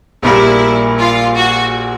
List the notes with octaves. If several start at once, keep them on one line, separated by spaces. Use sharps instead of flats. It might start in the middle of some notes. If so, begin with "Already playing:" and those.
A#1 A#2 G3 A#3 E4
F4
F#4